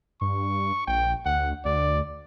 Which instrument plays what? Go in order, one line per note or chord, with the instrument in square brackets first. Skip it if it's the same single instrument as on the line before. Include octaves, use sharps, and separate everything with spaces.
[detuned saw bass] G2 [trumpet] C#6
[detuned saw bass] A#1 [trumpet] G5
[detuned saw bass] D2 [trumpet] F#5
[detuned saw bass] D2 [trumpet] D5